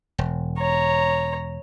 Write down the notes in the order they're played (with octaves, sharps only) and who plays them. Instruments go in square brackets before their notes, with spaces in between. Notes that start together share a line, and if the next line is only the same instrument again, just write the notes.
[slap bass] E1
[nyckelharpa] C#5 A#5